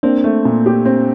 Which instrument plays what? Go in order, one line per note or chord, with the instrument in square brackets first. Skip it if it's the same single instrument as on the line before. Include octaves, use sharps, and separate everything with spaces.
[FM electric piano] A#3 D4 [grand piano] C4
[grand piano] A3
A#2
G4
C4